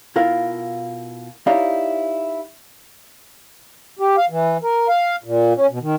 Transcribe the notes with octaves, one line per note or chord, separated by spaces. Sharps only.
B2 E4 F4 A#4 F5
D#4 E4 G4 C#5 D5 F5
G4
F5
E3
A#4
F5
A#2
C#4
B2
D#3